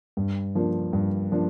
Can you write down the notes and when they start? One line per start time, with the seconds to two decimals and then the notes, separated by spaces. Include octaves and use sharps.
0.17 G2
0.55 F3 A#3 D4
0.93 G2
1.32 F3 A#3 D4